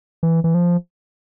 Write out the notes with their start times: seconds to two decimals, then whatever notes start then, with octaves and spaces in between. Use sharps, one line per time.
0.23 E3
0.44 E3
0.54 F3